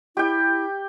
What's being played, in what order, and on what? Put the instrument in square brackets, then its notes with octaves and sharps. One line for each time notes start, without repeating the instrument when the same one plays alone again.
[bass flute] E4 [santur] G4 G5